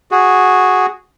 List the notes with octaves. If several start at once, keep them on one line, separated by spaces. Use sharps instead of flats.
F#4 G#4